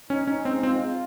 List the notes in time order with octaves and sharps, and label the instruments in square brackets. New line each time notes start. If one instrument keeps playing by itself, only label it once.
[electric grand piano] C#4 [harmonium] D#4
[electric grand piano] C#4 [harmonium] D#4
[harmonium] G#3 [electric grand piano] C4
[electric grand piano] C4 [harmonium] F4
[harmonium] F4